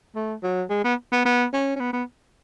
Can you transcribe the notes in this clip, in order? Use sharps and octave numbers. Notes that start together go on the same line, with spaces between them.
A3
F#3
G#3
B3
B3
B3
C#4
C#4
B3
B3